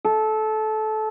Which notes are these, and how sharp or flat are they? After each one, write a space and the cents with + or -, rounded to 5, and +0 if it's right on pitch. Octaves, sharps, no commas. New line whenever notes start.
A4 -20